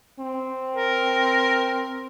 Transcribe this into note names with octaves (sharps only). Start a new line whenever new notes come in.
C4
A#4